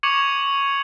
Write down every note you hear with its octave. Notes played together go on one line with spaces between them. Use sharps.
C#6 D6 G#6 C#7 F7 F#7